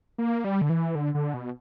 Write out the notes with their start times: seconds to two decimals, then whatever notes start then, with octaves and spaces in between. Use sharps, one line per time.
0.18 A#3
0.44 G3
0.61 D3
0.70 E3
0.95 D3
1.15 D3
1.34 B2